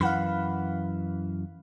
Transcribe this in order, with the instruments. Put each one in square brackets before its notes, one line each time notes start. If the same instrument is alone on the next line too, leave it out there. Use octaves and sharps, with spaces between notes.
[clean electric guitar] F#2 E3 [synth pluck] F5 F#5 B5